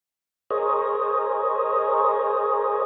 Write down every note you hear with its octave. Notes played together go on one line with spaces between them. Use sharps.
G#4 A#4 C5 C#5 D#5